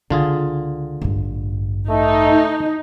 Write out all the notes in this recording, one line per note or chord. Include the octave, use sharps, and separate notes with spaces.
C#2 D3 F4 G#4
A1 G2
A3 D#4